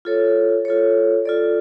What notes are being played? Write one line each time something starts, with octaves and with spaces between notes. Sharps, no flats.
F4 A4 C#5
F4 A4 C#5
F4 A4 D5